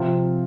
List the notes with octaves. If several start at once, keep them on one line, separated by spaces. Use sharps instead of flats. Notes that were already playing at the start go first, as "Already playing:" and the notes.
Already playing: C3 F3 C4 F4